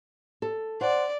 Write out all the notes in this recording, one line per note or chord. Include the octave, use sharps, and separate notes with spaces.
A4
C5 D5 F#5